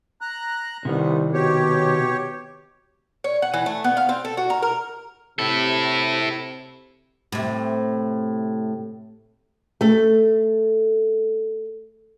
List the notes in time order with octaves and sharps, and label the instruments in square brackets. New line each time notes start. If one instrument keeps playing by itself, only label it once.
[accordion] A#5 F#6
[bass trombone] C2 [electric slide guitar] C3 D#3 [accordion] B3
[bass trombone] B2 [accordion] G4 C#5
[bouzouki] C#5
F#5
E3
A3
B3
F5
C4
A4
F#4
A#4
A#4
[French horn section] C3 [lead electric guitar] E4 A4
[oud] A2 C3
[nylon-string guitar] A3 A4